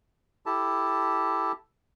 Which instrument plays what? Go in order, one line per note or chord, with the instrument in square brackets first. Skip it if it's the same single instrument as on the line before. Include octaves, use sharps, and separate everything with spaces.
[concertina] E4 G4 A4 A5